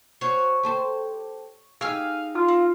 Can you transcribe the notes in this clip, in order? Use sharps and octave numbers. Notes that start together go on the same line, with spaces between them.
F#4 C5 C#5
G4 A4 C5
D#4 G4 G#4 F5 E6 F6
F4
C4